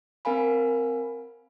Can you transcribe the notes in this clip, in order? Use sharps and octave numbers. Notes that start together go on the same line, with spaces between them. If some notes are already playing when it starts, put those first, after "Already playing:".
C4 A#4 F5 G#5 B5